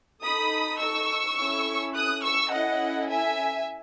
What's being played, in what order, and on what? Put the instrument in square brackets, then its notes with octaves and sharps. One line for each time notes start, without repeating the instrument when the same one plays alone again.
[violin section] D#4 A4 B5 D#6
C#6 E6
C#4 E4 A4
D#6 F#6
C#6 E6
C#4 E4 A4 D#5 F#5
E5 G#5